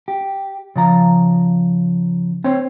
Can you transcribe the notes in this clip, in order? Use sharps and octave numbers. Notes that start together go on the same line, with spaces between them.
G4
C#3 F3 A#5
C4 C5 C#5